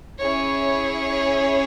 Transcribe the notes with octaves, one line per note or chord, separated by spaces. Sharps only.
C#4 E4 G#4 C#5